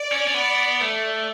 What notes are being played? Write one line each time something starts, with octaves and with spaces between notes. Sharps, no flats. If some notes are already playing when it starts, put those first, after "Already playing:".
Already playing: D5
C#4
C#4
B3
A3